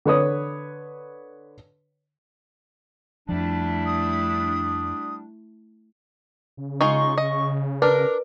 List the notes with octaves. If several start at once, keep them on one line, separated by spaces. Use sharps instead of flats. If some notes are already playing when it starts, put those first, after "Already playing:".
D3 B4 C#5 D#6
F2 F3 G3 A3 D4 E4
D#6
C#3
G#3 D#4 F4 C#6
D#5
D4 A#4 B4